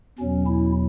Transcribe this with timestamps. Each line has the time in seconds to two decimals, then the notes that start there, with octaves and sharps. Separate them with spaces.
0.19 E2 B2 F#3 C#4
0.47 E4